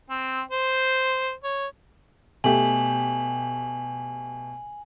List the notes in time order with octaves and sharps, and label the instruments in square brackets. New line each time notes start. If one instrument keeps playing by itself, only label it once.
[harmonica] C4
C5
C#5
[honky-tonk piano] B2 A3 G4 [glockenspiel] G#5 F#7